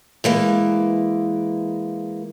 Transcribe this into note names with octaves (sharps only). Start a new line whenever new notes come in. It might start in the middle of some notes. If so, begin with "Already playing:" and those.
E3 G#3 A#3